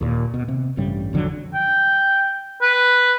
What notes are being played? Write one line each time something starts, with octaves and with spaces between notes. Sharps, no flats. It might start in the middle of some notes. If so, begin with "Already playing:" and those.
D#2 A#2
B2
C3
A1 G2 C#3 G3
G#1 F2 D3 F#3
G5
B4